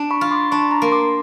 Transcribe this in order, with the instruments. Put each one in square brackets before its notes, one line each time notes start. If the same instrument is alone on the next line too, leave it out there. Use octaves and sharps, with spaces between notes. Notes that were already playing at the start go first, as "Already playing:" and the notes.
Already playing: [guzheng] D4
[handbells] B5 C#6
[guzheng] F4
[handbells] C6 D6
[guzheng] D4 [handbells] B5 C#6
[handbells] A#5 C6
[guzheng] A#3
[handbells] C6 D6